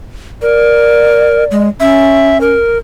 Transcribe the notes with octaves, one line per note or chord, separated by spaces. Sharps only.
A#4 D5
G#3
C#4 E5
A#4